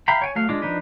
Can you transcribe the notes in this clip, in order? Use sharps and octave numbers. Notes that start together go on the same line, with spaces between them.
E5 F5 G5 A#5 B5
C#5 G5 G#5
F#3 A3 F5
G#3 D4 F4 D6
F3 D4 D#4 B4